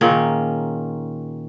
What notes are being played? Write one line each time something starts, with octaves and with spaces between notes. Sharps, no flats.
A#2 D#3 C#4 G#4